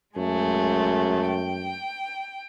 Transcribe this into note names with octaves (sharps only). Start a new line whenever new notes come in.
F#2 G#3 A3 G#4
G5